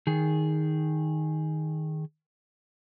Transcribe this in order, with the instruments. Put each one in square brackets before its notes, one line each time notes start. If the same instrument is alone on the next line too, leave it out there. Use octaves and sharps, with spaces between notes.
[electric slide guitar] D#3 G#4